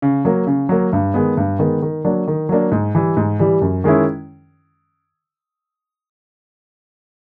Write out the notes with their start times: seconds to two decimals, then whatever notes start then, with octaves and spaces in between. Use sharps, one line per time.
0.02 C#3
0.25 F#3 A#3
0.47 C#3
0.69 F#3 A#3
0.93 G2
1.14 D#3 G#3 B3
1.37 G2
1.59 D#3 G#3 B3
1.82 D#3
2.05 F#3 A#3 D4
2.27 D#3
2.49 F#3 A#3 D4
2.71 G#2
2.95 E3 G3
3.17 G#2
3.39 E3 G3
3.61 F#2
3.84 D#3 G#3 C#4 E4